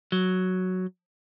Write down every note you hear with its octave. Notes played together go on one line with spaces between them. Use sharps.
F#3